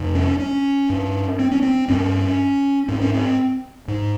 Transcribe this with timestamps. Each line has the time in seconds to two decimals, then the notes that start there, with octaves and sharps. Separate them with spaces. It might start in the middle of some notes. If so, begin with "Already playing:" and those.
Already playing: F2 C3
0.15 C#4
0.39 C#4
0.90 G2
1.39 C4
1.51 C#4
1.62 C4
1.88 G2 C#4
2.88 G#2 C4
3.01 C#4
3.14 C4
3.88 G#2